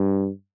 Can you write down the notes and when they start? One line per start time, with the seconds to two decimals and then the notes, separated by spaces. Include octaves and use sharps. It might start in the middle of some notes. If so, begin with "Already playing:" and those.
Already playing: G2